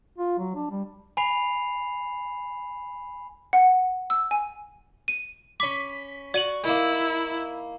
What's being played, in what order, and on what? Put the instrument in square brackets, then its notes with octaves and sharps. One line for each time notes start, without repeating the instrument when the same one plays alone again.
[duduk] F4
F#3
D4
G3
[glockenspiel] G#5 B5 C7 F7
[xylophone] F#5
E6
G#5
D#7
[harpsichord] C#4 B5 [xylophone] D6
[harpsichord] F#4 [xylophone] D5 D#7 F#7
[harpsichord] D#3 A#3 [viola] E4